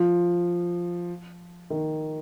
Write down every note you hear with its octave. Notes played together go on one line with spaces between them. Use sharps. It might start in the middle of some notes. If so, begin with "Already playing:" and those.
Already playing: F3
D#3